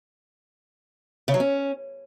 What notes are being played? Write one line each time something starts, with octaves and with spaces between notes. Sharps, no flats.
C#3
F#3
C#4